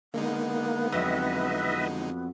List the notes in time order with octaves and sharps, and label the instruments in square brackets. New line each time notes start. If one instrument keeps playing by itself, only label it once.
[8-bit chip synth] D3 G#3 D#4 [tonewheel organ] A#3 [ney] B3
[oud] F2 F#3 [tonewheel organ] B4 D#5 E5